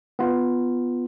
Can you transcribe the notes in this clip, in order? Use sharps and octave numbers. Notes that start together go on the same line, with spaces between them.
B3 F4